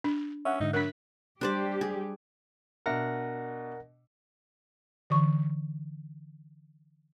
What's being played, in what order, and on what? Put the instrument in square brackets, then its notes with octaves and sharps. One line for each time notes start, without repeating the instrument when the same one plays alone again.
[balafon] D4
[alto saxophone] C#4 [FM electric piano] E5 F#5
[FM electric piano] G#2 D3 [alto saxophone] D#4
[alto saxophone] F#3 [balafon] D4 A#4 [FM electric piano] F#6 B6
[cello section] G3 G4 [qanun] D4 C5 D5
[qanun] G#4
[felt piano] B2 D4 E5 [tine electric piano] A#4 F#5 A#6
[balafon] D3 E3 C#6